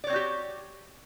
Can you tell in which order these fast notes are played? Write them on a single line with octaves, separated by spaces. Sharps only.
D5 C#5 C4 F#4 G4